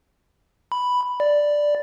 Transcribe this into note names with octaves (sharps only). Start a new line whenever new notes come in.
B5
D5